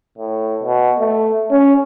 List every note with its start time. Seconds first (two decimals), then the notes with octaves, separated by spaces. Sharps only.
0.18 A2
0.63 B2
0.99 A3
1.51 C#4